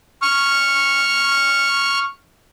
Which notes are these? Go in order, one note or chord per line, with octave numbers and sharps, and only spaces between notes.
C#6 F6